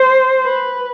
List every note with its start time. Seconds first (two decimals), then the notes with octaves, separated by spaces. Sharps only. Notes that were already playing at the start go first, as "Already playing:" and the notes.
Already playing: C5
0.44 B4